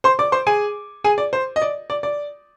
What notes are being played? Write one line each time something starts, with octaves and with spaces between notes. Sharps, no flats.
C5 C6
D5 D6
C5 C6
G#4 G#5
G#4 G#5
D5
C5
D#5
D5
D5
D5